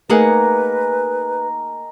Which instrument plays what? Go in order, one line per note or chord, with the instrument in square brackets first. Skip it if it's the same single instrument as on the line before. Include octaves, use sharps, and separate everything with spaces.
[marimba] A3 [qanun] A#3 G#4 F#5 [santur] D#4 A#4 G#5 [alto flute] B4